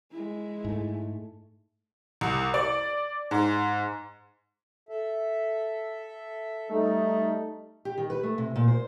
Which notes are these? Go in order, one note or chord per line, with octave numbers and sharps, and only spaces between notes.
G#3 E4
G#2 A3
C2
D5
G#2
A4 E5
G3 A3 D#4
G4
D#3
B4
A3
C3
A#2
C5